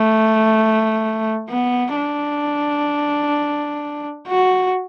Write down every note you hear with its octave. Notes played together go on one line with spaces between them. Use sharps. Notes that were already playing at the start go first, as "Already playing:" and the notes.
Already playing: A3
B3
D4
F#4